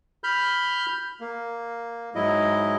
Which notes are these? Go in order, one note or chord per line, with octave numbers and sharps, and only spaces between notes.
B5 F6 G6
A#3
G#2 F#3 E4 D#5